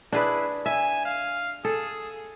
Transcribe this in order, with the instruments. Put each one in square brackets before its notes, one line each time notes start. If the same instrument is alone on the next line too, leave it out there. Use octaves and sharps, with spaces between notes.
[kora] D4 G#4 B4 [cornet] E4
[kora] E5 [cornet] G#5
[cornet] F5
[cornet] G#4 [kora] A4